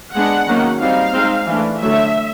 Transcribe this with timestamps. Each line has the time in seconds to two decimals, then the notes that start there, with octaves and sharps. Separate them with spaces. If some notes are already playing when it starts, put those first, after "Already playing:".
0.14 G#3 B3 D4 F#5
0.47 D#3 F#3 A#3 C#4
0.80 G3 C4 D#4 F5
1.14 G#3 C4 D#4
1.47 E3 A3 D4
1.81 D3 F#3 A3 E5